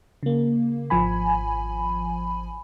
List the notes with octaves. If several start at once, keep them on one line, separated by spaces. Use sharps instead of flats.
C#3 A#3
G#1 F3 G#5 B5